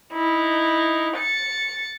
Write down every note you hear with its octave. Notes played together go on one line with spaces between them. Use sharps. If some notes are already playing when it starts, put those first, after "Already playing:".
D#4 E4
A6 C#7